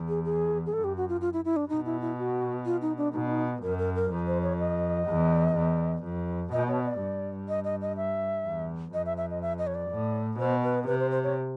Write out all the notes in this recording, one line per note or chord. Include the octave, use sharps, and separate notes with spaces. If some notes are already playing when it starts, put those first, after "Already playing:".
Already playing: E2
G#4
G#4
G#4
F#2 A4
G4
F#4
F4
F4
E4
E4
D4
B2 D#4
E4
E4
F#4
F4
D#4
D4
B2 D#4
D4
D#4
F#2 A#4
A#4
A#4
F2
C5
C#5
D#5
E2
E2
F2
B2 D#5
C#5
D5
G2
D#5
D#5
D#5
E5
E2
F2 D#5
E5
E5
D#5
E5
D#5
C#5
D5
A2
B2 C5
B4
C3 B4
C5
C5
C#5